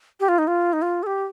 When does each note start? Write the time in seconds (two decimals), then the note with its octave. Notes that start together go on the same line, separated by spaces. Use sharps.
0.20 G4
0.29 F4
0.38 D#4
0.47 F4
0.73 D#4
0.82 F4
1.03 A4
1.07 G4